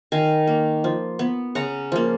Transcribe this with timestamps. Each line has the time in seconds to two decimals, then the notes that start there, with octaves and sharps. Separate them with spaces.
0.12 D#3 F5 G#5
0.47 A#3
0.84 F3
1.19 B3
1.55 C#3 F#5 A#5
1.92 F3 A#3